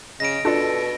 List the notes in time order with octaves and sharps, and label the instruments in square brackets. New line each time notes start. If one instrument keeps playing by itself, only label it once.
[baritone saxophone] C#3 [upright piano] D#5 [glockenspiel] A#6 D7
[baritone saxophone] B2 [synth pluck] D4 F4 D5 [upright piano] A4